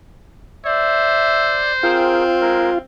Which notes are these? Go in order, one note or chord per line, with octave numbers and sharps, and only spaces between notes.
C5 D5 E5
C4 F4 G#4 A#4 G5
G#3 A#4